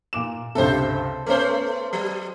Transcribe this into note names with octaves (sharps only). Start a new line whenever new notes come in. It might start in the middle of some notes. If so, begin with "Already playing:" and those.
A#2 D6 E7
C#2 G2 C3 A4 C5
A3 B3 C#4 C5
F#3